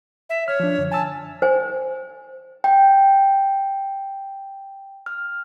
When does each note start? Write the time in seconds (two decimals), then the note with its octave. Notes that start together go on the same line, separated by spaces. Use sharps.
0.30 E5
0.48 C#5 F6
0.60 F3 D4
0.78 F#2 D3
0.92 G#5 A5 E6
1.42 C5 G#5
2.64 G5
5.06 F6